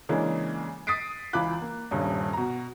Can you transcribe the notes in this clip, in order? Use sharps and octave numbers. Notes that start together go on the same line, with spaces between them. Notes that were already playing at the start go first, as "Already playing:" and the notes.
C#3 E3 G#3 A#3 D4
D#6 A6 B6 C7 D7
C#2 E3 F4 B5 D6 F#6
A#3
D#1 G2 C#3
B2 A#5